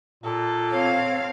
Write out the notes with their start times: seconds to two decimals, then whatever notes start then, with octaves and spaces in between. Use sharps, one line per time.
0.24 A#2 A4
0.72 C4 C#5 F5